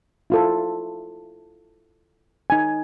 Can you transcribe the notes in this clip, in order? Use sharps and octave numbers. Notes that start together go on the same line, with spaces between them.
E4 F4 A4
D#4 G#5